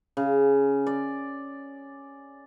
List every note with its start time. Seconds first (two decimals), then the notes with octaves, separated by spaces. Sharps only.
0.17 C#3
0.87 D5